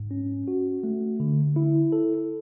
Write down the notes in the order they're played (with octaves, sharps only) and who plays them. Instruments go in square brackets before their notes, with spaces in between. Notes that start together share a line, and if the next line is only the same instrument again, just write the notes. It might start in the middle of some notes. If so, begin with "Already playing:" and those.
Already playing: [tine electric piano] G#2
C#4
F#4
A3
D3
E4
A4